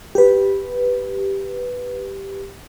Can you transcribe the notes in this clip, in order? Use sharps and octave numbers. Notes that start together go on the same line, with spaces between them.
G4 B4